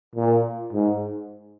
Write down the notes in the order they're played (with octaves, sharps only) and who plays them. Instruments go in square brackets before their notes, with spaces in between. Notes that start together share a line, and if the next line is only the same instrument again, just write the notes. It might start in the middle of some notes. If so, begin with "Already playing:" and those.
[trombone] A#2
G#2